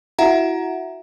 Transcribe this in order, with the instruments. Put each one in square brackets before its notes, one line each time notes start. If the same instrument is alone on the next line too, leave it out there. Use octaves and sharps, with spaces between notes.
[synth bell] E4 F#4 E5 F#5 A#5